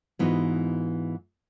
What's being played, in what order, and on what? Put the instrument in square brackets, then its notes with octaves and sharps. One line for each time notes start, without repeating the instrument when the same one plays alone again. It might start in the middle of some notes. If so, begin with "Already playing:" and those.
[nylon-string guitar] G#2 E3 B3 D#4 F4 F#4